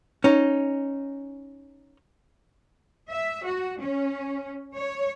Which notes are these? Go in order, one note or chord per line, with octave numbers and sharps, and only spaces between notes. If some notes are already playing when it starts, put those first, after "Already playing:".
C#4 D#4
E5
F#4
C#4
C#5